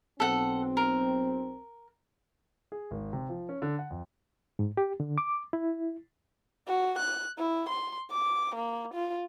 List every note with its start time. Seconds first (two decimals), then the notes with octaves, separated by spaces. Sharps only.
0.20 B1 C4 A4 F#5
0.77 A#4
2.72 G#4
2.91 G#1
3.13 C3
3.29 F3
3.49 C#4
3.62 D3
3.79 F#5
3.90 F2
4.59 G#2
4.77 G4
5.00 D3
5.18 D6
5.53 E4
6.68 F#4
6.99 F#6
7.38 E4
7.70 C6
8.11 D6
8.55 A#3
8.94 F4